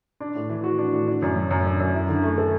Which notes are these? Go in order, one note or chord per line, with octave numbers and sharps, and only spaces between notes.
D4
A2
E3
F#4
D4
A2
D4
F#2
F#3
F#2
D4
F#2
E4
D3
A3
A4